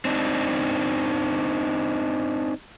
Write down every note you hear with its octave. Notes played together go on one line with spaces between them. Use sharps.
C4 D4 D#4